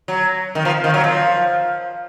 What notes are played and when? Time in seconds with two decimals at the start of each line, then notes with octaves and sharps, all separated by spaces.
0.08 F#3
0.55 D#3
0.65 F3
0.84 D#3
0.94 F#3
1.04 F3